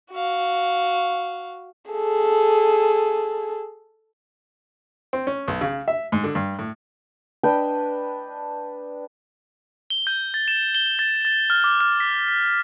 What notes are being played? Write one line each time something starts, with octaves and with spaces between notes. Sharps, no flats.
F#4 F5
G#4 A4
C4
C#4
B1
C#3
E5
G#2
D3
G2
A2
D4 B4 D#5 G5
G7
G6
A6
E7
G7
A6
A6
F6
D6
F6
B6
B6